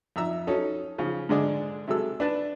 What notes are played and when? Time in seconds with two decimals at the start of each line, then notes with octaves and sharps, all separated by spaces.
0.16 F2 E5 A#5 E6
0.47 F#3 C#4 D#4 A4
0.98 C#3 F3
1.29 G#2 D3 G#3 D4 D#5
1.88 C3 F#3 G#3 A4 E6
2.20 D4 B4 A5